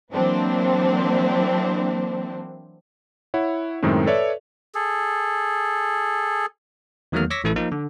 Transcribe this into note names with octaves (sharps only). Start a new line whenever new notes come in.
E3 F#3 A#3 C4 D4 C5
E4 C#5 F#5
F#2 A2 D#3 G#3 C4
A4 B4 C#5 D5 E5
G#4 A4
E2 D#3 F#3 A3 A#3 F6
C#5 C#6 D6 E6 A#6 B6
A1 E3 A3 E4 A4
F3 A#3 D#4
D3